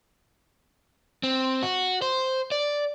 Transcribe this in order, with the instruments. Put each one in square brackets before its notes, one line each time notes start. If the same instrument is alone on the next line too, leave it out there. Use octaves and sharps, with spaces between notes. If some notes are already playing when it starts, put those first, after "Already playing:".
[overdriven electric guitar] C4
F#4
C5
D5